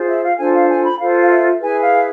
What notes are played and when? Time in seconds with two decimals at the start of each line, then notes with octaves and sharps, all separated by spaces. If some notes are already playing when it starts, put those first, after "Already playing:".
Already playing: F4 G#4 C5
0.08 E5
0.23 F5
0.38 D4 F4 A4 C5 G#5
0.54 F5
0.69 G#5
0.85 B5
1.00 F4 A4 C5 F5
1.22 F5
1.31 E5
1.61 E4 G#4 B4 G#5
1.81 F5